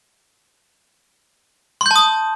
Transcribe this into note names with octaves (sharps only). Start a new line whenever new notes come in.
A5 C6 D#6 G6